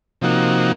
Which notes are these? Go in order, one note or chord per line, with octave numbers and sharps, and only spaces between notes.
C3 F3 A#3 D#4 F#4